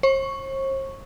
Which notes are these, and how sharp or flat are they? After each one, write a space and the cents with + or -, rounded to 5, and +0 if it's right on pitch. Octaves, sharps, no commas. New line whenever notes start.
C5 +45 C#6 +0